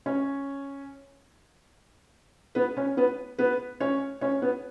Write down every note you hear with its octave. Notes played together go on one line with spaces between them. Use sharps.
C#4 C#5
B3 B4
C#4 C#5
B3 B4
B3 B4
C#4 C#5
C#4 C#5
B3 B4